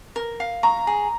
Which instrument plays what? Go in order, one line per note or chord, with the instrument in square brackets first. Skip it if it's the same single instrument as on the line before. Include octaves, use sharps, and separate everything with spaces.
[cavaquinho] A#4
F5
[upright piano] A#5 [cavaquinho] C#6
[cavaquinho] G#4